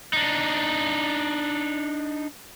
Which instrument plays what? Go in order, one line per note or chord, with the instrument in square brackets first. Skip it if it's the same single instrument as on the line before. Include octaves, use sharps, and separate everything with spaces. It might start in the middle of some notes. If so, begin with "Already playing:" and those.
[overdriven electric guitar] D4 D#4